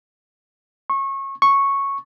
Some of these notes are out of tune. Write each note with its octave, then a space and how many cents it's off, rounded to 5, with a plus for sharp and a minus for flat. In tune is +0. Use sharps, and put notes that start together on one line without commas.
C#6 -25
C#6 -5